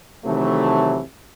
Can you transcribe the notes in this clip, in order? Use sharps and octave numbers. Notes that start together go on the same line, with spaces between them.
C3 D#3 E3 F#3 A3